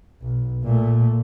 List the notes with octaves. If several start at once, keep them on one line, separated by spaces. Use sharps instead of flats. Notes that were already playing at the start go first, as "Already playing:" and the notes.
B1
A#2 A3